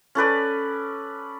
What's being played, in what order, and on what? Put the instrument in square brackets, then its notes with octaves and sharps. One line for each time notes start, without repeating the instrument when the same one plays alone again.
[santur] C#4 A4 B4 D5